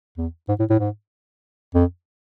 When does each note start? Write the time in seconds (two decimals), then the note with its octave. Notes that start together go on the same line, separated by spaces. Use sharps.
0.17 E2
0.48 G#2
0.59 A2
0.70 A2
0.80 G#2
1.74 F2